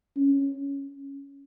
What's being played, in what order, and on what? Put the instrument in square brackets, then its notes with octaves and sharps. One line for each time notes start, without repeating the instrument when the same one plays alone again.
[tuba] C#4